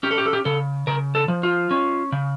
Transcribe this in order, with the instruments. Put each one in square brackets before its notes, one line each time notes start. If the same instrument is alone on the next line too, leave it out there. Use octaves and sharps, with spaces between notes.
[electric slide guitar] C#4 G4
A4
G4
A4
G4
C#3 A4
C#3 A#4
A4
F3
F4
C#4
C#3